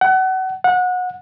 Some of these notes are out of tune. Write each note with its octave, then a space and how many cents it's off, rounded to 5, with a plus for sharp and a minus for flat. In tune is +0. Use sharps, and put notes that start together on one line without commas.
F#5 +30
F#5 -25